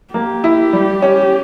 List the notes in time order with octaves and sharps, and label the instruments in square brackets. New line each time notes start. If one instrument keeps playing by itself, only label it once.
[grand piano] A#3 [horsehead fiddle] G4
[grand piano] E4
G3
C#4